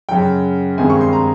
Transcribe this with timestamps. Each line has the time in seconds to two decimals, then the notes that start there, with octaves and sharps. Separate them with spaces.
0.09 F#2 C#3 F#3 G5
0.78 G2 D#3 G#3 C4 D#4 G#5
0.90 C#6
1.01 C6
1.13 A#5